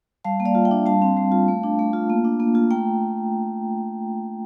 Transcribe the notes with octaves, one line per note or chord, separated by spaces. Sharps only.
G3 F5 A5
A#3
D5 F5
F4
E5 G5
D4
G3 F5 A5
C4
G3
F4
A3
D4
A3
F4
A#3
D4
A#3
F4
A3 G5 A#5